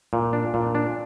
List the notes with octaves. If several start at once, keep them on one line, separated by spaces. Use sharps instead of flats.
A#2
D4
A#2
D4